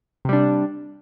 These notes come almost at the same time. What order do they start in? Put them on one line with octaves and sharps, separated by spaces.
C3 G3 D4